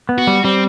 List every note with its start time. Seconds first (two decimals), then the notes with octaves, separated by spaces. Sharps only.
0.09 B3
0.18 F#4
0.27 G3
0.44 G3 C4